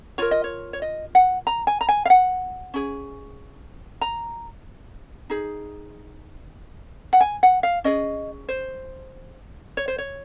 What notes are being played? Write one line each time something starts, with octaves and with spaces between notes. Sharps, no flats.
F4 A#4 C#5
D#5
C#5
C#5
D#5
F#5
A#5
G#5
A#5
G#5
F5
F#5
C#4 G#4
A#5
D#4 G#4
F#5
G#5
F#5
F5
C#4 G#4 D#5
C5
C#5
C5
C#5